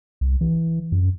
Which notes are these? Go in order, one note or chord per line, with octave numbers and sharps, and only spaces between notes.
C2
E3
F#2